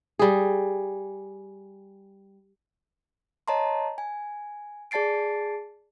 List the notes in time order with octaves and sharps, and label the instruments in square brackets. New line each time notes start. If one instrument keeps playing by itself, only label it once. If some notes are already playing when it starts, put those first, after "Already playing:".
[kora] G3 G#4
[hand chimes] C#5 D#5 A5 A#5 C6
G#5
G#4 D5 A5 A6 C7 D7